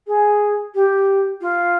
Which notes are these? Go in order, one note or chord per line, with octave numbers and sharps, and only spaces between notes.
G#4
G4
F4